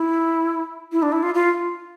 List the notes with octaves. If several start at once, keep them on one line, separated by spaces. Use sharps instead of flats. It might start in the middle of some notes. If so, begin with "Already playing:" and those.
Already playing: E4
E4
D4
E4
F4
F4